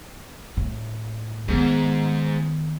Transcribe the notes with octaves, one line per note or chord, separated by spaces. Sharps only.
A2
G#2 D#3 B3